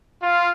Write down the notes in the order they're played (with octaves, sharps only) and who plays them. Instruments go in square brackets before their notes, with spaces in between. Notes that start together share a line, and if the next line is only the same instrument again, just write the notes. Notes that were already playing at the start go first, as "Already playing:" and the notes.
[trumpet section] F4